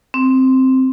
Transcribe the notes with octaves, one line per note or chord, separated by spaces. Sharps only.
C4